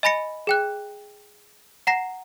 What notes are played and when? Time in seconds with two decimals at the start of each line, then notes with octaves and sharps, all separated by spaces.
0.03 D#5 G#5 B5 A#6 C#7
0.47 G#4 G5 F#6
1.87 F#5 A#5 A#6 C7